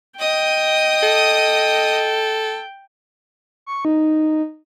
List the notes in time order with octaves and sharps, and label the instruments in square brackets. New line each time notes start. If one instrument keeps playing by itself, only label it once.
[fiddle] D#5 D#6 [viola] G5
[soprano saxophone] A4
[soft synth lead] C#6
D#4